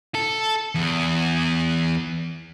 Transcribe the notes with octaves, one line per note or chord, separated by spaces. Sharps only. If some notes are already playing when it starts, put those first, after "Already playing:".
A4
E2